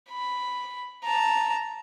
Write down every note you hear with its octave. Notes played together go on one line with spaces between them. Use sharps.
B5
A5 A#5